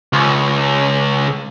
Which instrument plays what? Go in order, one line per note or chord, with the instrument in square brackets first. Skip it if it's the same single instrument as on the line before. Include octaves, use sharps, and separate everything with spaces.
[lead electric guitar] C#2